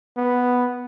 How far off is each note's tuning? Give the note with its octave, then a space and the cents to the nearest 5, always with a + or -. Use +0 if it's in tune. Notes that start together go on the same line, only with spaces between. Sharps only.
B3 +0